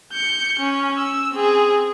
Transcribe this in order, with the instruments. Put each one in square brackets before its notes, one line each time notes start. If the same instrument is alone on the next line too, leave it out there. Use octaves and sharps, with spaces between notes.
[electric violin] G6 C#7
C#4
E6
C4 G#4